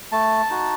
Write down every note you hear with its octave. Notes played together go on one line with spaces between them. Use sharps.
A3 A5
D#4 F#4